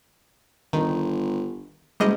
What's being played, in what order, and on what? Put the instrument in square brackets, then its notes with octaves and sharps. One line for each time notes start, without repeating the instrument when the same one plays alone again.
[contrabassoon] G1 [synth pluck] D#3
[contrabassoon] F#1 [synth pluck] G3 G#3 D#5